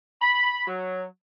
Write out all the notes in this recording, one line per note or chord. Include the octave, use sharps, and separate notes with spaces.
B5
F#3